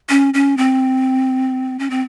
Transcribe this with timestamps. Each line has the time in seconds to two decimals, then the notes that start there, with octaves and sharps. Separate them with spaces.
0.09 C#4
0.34 C#4
0.57 C4
1.79 C#4
1.90 C4